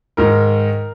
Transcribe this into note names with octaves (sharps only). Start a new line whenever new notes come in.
G#2 D#3 A#4